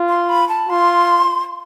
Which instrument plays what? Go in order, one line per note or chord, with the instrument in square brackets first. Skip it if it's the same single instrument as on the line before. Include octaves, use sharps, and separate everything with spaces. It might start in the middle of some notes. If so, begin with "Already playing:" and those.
Already playing: [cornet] F4
[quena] C6
B5
A5
[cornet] F4 [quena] C6